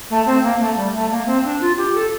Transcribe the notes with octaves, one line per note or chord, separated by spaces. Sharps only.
A3
C4
A#3
A3
G3
A3
A#3
C4
D4
F4
G4
A4